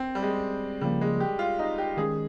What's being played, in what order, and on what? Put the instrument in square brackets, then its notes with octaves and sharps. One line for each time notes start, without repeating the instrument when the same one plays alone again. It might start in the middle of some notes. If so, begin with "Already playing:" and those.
Already playing: [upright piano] C4
G3
G#3
[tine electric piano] C#3 F3 A#3 [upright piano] G3
[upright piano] G#3
G4
F4
D#4
G4
[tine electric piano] D#3 G#3 C#4 [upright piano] G#4